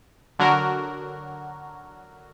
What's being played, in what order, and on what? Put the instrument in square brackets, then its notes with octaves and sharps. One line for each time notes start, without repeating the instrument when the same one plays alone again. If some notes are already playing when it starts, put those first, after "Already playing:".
[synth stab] D3 F#3 F#4 A#4